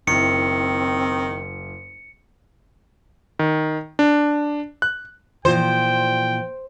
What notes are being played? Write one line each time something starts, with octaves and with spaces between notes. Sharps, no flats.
F#1 D#3 C4 E4 C#7
D#3
D4
F#6
A#2 E3 F3 C5 G5